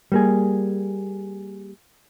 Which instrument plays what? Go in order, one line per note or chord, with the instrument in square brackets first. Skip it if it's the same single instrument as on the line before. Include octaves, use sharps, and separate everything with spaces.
[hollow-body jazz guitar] G3 A#3 G#4